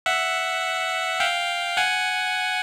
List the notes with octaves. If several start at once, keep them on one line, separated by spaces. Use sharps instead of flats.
E5 F#5
F5 G5
F#5 G#5